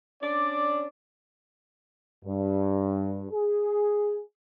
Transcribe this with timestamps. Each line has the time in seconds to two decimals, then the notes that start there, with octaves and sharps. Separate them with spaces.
0.22 C#4 D4 D5
2.25 G2
3.31 G#4